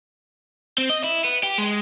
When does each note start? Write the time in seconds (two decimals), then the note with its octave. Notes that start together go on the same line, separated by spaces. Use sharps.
0.78 C4
0.90 D#5
1.04 E4
1.25 B3
1.44 G4
1.58 G#3